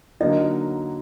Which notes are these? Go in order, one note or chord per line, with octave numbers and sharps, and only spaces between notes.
D3 F#3 A#3 D#4 D#5